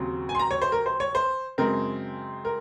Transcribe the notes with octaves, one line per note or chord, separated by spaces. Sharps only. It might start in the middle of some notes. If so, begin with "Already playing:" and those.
Already playing: D#2 C#3 F#3 C4
G#5
C6
A#5
C#5
C5
A#4
C5
C#5
C5
F#2 C#3 G#3 C4 A#4
A#4